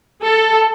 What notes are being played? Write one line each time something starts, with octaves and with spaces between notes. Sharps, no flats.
A4